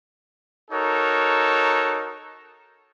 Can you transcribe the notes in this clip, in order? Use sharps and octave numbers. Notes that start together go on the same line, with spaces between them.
D#4 F#4 A4 A#4 C#5